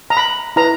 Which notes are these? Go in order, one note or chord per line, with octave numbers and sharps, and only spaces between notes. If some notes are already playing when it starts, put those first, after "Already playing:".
A#5
B5
E4 B4 A#5